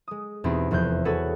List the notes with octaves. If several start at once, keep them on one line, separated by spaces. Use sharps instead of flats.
G#3 D#6
E2 B2 C4 D#4 G4 B5
F1 E2 C3 F#6 G6
F#4 G#4 A4 B4 C#5 F#5